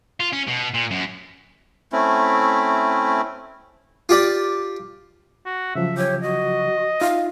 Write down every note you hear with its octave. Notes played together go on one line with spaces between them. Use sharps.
F4
C#4
B2
A#2
F#2
A3 C4 C#4 E4
F4 G4 D5
F#4
C#3 F3 F#3 E5
G4 C#5
F#4 D#5
D#4 F4 E5 F5